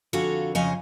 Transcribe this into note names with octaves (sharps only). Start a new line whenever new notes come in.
F2 D3 F#4 A4 F5 G#5
F2 C#3 C#4 D#5 F5 G#5